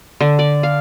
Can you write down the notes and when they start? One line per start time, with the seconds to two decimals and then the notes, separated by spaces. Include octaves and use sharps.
0.21 D3
0.39 D5
0.63 F5